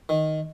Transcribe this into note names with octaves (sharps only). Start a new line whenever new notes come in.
D#3